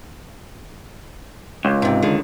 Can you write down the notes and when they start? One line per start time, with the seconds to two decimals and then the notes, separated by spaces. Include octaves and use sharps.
1.65 C#2
1.82 G#2 C3
2.02 D3 D#3 G#4